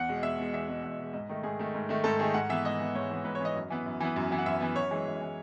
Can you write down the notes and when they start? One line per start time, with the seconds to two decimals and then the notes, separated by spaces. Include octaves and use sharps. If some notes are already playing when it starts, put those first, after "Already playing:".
Already playing: E2 F#5
0.09 B2 G#3
0.23 E2 E5
0.38 B2 G#3
0.53 E2 E5
0.68 B2 G#3
0.84 E2
0.99 B2 G#3
1.13 G#2 D#5
1.29 D#3 A3
1.43 G#2 G#4
1.59 D#3 A3
1.75 G#2
1.89 D#3 A3
2.04 G#2 A4
2.19 D#3 A3 G#4
2.34 G#2 F#5
2.49 E3 B3 E5
2.64 G#2 D#5
2.80 E3 B3
2.95 G#2 C#5
3.10 E3 B3
3.25 G#2 B4
3.35 C#5
3.40 E3 B3 D#5
3.55 F#2
3.70 E3 B3
3.86 F#2
4.00 E3 B3
4.16 F#2
4.31 E3 B3
4.38 F#5
4.46 F#2 E5
4.60 E3 B3
4.76 F#2 C#5
4.91 E3 G#3
5.06 F#2
5.21 E3 G#3